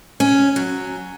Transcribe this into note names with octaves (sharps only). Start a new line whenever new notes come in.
C#4
F#3